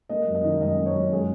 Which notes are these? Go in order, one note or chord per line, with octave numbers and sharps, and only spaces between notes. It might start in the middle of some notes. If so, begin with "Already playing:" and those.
A#3 D#5
F#2
D#5
D#3
F#2 D#5
A#3
C#5
F#2
G#3 G#4